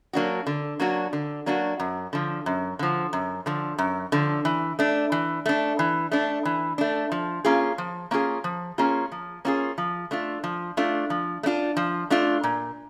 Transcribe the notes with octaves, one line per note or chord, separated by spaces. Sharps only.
F#3 A#3 D4 F#4
D3
F#3 A#3 D4 F#4
D3
F#3 A#3 D4 F#4
F#2
D3 F3
F#2
D3 F3
F#2
D3 F3
F#2
D3 F3
E3
A3 D4
E3
A3 D4
E3
A3 D4
E3
A3 D4
F3
A#3 C#4 F4 G#4
F3
A#3 C#4 F4 G#4
F3
A#3 C#4 F4 G#4
F3
A#3 C#4 F4 G#4
F3
A3 D4 F4
F3
A3 D4 F4
F3
A3
D4 F4
F3
A3 D4 F4
A#2